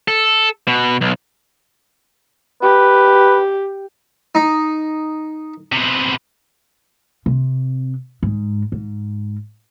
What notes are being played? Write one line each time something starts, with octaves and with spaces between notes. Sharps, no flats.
A4
B2
B1
G4 B4
D#4
C3 B3
C3
G#2
G#2